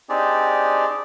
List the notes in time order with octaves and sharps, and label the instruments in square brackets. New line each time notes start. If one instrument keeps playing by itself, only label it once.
[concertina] C4 D4 D#4 G4 G#4 D5